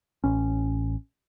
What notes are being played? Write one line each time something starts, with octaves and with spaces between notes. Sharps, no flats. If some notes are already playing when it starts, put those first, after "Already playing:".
A1 C#4